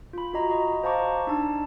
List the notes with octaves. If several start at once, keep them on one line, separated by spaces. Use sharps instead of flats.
F4 B5
F4 F#4 D#5 A#5
F#4 D#5 B5
C5 F5 A5 A#5 C#6 D6
D4 D#4 A5 E6